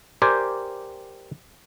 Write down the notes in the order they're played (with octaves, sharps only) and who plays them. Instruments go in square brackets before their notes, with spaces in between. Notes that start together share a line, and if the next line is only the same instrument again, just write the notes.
[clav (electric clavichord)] G4 A#4 C5 D5 G5 G#5